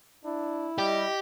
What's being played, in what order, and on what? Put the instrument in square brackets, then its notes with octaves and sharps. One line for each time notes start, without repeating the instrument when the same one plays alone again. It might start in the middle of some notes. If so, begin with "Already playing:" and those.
[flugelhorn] D4 [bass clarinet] E4
[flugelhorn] G3 [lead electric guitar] G4 [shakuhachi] D#5